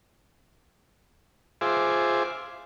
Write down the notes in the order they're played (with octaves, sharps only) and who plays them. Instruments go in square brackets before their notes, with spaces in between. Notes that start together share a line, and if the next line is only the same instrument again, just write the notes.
[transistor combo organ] F4 G#4 C5 E5 D6